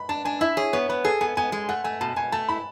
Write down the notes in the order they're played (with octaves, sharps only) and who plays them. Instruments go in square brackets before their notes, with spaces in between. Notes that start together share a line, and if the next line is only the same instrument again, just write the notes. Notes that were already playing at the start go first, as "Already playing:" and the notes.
Already playing: [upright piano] B5
[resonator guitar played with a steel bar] D4 [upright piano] A5
[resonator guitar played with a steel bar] D4 [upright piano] G#5
[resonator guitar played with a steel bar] E4 [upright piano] E5
[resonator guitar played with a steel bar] G#4 [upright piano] C#5
[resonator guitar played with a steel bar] B3 [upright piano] C#5
[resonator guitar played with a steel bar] B3 [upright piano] B4
[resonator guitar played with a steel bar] G#4 [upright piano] A4
[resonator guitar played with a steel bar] B3 [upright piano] G#5
[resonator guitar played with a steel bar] B3 [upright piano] G#5
[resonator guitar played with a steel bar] G#3
[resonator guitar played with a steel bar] A3 [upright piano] F#5
[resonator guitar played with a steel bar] A3 [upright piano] G#5
[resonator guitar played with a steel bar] B2 [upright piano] A5
[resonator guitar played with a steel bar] B2 [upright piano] G#5
[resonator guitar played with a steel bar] A3 [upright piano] A5
[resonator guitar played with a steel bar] E4 [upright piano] B5